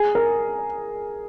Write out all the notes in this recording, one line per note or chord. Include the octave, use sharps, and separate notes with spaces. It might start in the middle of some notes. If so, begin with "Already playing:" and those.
Already playing: G#4
A#4